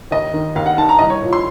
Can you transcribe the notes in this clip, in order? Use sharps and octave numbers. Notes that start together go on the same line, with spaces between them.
D#2 D#5
D#3
D#2 F5
F#5
D#3 A5
A#5
C2 D#5
C#5
A#2 F3
C6